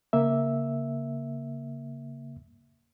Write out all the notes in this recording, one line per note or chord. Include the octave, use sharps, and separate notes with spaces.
C#3 A#3 E5